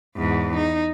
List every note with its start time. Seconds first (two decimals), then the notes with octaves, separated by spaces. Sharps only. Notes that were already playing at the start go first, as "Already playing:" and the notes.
0.17 E2 G#2
0.57 D#4